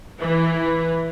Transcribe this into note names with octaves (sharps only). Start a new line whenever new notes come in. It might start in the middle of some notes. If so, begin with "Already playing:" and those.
E3